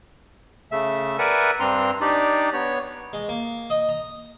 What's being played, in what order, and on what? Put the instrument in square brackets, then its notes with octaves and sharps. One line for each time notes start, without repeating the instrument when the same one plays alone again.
[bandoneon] C#3 A3 E5
A#4 B4 D5 E5 F#5 G#5
G2 C4 D4 A#5 C6
D4 D#4 G4 D5
B3 C#5
[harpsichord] G#3
A#3
D#5
A#5